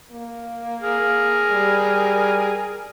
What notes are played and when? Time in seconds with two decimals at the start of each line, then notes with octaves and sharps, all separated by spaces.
0.12 A#3
0.81 G#4 A#4
1.51 G3